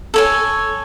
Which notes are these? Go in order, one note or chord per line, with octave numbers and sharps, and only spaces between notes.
A4 C#5 G#5